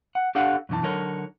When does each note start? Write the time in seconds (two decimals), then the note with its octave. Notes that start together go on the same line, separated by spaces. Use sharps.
0.15 F#5
0.35 D4 G4 A4 F5 F#5
0.69 F#2 B2 E3 D#4 A5
0.83 D3 F#3 D#4 A4 A#4 C#5